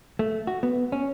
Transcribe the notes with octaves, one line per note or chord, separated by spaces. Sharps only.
A3
F#4
B3
C#4